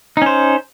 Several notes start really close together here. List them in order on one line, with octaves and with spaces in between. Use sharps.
D#4 C#4 C5